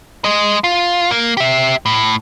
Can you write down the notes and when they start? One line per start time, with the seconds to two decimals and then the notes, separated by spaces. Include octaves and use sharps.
0.25 G#3 D#5
0.64 F4
1.11 A#3
1.37 G4 E5
1.86 A2